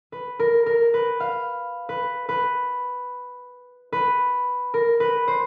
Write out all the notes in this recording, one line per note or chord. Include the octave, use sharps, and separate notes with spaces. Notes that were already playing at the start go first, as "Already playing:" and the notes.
B4
A#4
A#4
B4
F5
B4
B4
B4
A#4
B4
C5